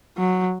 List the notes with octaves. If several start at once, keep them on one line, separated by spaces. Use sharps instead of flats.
F#3